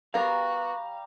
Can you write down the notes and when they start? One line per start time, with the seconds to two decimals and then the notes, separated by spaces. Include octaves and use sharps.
0.14 G3 B3 F#4 A#4 F5 A#5